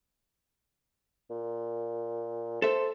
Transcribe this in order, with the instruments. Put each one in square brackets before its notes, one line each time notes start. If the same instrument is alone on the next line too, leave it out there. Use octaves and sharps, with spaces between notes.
[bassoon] A#2
[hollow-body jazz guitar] A4 E5 [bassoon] C5